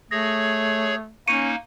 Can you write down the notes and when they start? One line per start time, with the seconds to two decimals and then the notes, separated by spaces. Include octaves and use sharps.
0.11 A3 G#4 C#5 A#6
1.28 A#3 C#4 D#4 C#6 C#7 D#7